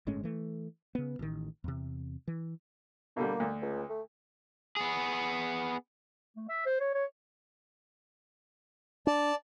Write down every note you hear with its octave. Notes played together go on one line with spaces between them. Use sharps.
G1 A2 G#3 C#4
E3 A3
C#3 B3
A1 D#3
E2 C3
E3
B2 D3 G3 A#3
D2
C#2
A3
B3 G#4
A3
E5
C5
C#5
C#5
D4 D5 A5